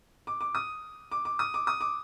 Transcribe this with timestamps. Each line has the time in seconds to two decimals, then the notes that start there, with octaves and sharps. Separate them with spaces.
0.27 D6
0.41 D6
0.55 D#6
1.11 D6
1.25 D6
1.39 D#6
1.54 D6
1.67 D#6
1.81 D6